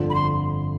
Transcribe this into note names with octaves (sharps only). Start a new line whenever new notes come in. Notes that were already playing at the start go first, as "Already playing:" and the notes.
Already playing: G1 F2 D3 F3
B5
C6